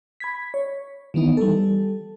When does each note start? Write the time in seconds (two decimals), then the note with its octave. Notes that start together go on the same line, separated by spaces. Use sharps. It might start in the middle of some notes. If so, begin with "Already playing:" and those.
0.20 B5 G#6 B6
0.54 C#5
1.14 D#3 E3 B3 D#4
1.37 G3 A4